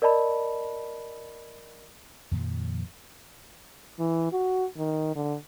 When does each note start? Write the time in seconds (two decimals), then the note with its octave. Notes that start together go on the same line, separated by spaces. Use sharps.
0.02 A#4 D5 D#5 A5 B5
2.31 F2 A#2 D#3 F3
3.99 E3
4.33 F#4
4.77 D#3
5.16 D3